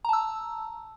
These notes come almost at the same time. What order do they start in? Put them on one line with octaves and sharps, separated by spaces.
A#5 A5 E6